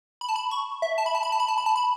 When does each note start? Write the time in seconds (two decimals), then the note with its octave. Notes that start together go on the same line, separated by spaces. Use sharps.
0.21 B5
0.29 A5
0.36 B5
0.51 C#6
0.82 E5
0.98 A5
1.06 B5
1.15 A5
1.23 B5
1.32 A5
1.40 B5
1.48 A5
1.58 B5
1.66 A5
1.76 B5